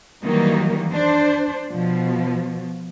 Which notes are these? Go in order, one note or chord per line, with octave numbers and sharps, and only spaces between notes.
D#3 E3 F#3 G3 A#3 D#4
D4 C5
B2 F3